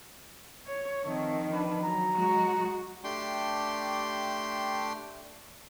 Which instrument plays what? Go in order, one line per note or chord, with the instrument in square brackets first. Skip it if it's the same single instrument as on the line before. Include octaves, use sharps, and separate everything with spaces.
[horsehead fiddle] C#5
[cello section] D#3 F3 [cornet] A3 [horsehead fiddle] C4
[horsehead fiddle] D4 [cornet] B4
[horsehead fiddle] F#3 [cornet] A#5
[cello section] G#3 F#4
[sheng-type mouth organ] A3 D4 G4 G5 C6